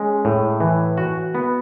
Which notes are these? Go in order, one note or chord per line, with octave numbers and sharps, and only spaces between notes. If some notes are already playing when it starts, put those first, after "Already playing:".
Already playing: G#3 C#4
A2
E3
F#4
B3